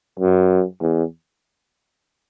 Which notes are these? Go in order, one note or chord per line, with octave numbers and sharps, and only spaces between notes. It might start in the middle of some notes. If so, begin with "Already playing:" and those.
F#2
E2